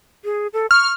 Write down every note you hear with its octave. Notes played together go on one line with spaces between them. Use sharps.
G#4
A4
C#6 F6